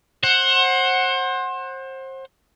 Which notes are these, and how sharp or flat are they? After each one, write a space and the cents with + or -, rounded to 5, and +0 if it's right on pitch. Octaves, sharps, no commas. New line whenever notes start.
C5 +30 F#5 +0